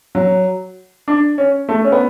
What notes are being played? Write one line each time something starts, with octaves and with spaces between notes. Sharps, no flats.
F#3
D4
C#4
A3
C#4
B3